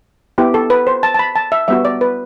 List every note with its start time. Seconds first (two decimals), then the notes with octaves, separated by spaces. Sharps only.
0.38 B3 E4 G4
0.54 A4
0.70 B4
0.87 C5
1.03 A5
1.14 A5
1.19 B5
1.35 A5
1.52 E5
1.68 G3 B3 F#4 E5
1.85 D5
2.01 B4